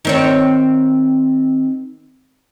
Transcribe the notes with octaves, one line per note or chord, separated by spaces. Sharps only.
D#3 C4 C#5